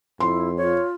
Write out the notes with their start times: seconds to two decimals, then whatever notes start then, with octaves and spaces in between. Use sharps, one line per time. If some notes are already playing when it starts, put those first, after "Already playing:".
0.20 F2 E4 C6
0.58 F4 C#5